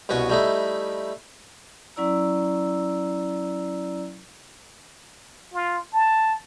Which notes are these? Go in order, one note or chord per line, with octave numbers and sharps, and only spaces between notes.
C2 B2 C#4 F#4 C#6
G3 A3 D#4 E4
F#3 C#4 E4 D5 A#5 E6
F4
A5